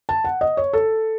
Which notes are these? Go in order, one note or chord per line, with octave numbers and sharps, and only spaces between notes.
A5
F#5
D#5
C#5
A4